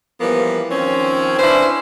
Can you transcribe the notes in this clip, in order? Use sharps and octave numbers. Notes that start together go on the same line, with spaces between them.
E3 F3 G3 A#3 B3
D#3 F3 C4 C#4
C#4 D4 E4 B4 C5